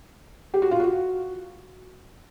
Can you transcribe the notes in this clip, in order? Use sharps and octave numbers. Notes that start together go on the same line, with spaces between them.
G4
F#4
F4
F#4